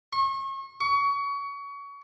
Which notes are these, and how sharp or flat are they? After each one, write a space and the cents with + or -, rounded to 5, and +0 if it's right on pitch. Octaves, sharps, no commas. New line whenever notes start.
C#6 -40
C#6 +25